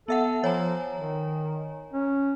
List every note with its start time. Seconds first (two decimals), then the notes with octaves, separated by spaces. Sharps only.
0.08 B3 A4 E5 F#5
0.44 F3 C#5 G#5 A#5
0.94 D#3
1.93 C#4